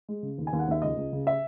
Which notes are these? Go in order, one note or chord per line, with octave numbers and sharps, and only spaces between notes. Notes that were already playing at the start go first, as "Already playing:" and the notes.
G#3
C#3
D#2
G#5
D#2
F#5
D#2 E5
C#2 D#5
C#2
C#3
E5